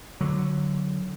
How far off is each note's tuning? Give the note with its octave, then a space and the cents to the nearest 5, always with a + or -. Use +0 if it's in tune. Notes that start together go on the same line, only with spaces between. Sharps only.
D3 +0 F#3 +0